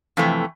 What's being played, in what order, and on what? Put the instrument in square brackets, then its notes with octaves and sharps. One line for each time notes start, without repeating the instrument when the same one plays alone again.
[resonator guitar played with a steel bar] F2 C3 E3 A3